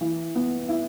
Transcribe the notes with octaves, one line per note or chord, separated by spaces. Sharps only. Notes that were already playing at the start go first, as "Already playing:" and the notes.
E3
B3
E4